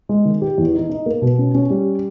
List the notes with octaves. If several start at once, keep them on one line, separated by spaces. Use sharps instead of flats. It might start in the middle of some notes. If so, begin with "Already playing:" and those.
G#3
D#3
G4
E2
D#4
D#4
A#3
B2
C#4
C#4
G3